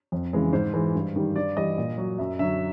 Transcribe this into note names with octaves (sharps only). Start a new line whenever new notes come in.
F2
C#3 E3 G#3
G#2 C5
E3 G#3
G2
D#3 G3
G2 D5
E3 G3 D#5
A#2
F#3
F#2 E5
D3 F#3 E5